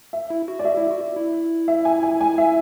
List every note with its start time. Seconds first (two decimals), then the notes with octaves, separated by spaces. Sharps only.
0.13 E5
0.30 E4
0.48 F#4
0.59 D5
0.64 F#4 E5
0.77 E4
0.91 F#4
1.16 E4
1.68 E5
1.85 G#5
2.03 G#5
2.21 G#5
2.38 E5